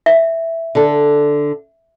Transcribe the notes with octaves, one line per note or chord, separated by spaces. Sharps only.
E5
D3 A4